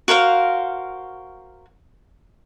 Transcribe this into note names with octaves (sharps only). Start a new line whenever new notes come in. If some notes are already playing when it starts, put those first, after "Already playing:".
F#4 A#4 C5 F5